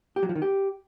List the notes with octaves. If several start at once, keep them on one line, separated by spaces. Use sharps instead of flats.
G4
F#3
F3
D#3
G4